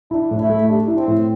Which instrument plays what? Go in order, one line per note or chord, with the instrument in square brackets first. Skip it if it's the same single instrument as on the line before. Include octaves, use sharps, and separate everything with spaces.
[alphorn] D4 [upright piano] E4
[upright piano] A2
[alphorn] E4
[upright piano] A3
[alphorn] D4 [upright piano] G4
[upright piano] E4
[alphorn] C4
[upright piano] A2